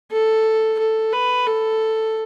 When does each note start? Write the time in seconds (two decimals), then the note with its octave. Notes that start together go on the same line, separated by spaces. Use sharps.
0.11 A4
0.79 A4
1.13 B4
1.47 A4